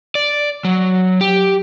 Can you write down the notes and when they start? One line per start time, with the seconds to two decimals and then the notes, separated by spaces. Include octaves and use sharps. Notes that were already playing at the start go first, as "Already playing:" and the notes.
0.15 D5
0.65 F#3
1.21 G4